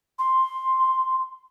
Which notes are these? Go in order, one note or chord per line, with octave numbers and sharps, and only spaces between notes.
C6